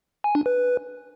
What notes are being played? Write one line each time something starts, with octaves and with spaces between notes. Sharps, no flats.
G#5
D4
B4